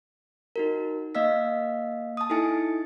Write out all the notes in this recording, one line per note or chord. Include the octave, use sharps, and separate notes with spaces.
D#4 F#4 A#4
A#3 D#5 F5 E6 B6
A5 D#6
D#4 E4 A4 G#5 A6 C#7